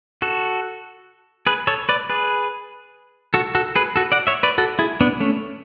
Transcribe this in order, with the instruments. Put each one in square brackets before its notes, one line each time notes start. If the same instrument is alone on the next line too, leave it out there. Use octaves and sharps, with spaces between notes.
[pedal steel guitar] F#4 A4
G#4 B4
A4 C#5
B4 D5
G#4 B4
F#4 A4
F#4 A4
G#4 B4
F#4 A4
D5 F#5
C#5 E5
B4 D5
F#4 A4
E4 G#4
B3 D4
A3 C#4